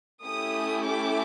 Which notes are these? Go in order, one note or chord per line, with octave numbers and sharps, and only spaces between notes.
A3 C#4 E4 G4 D#6
D6